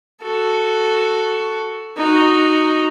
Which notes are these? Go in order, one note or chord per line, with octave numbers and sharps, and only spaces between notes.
F#4 A4
D#4 F#4